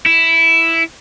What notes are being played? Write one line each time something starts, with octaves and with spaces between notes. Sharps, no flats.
E4